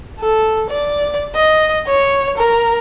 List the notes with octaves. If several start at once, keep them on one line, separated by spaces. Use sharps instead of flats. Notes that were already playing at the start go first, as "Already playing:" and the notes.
A4
D5
D#5
C#5
A#4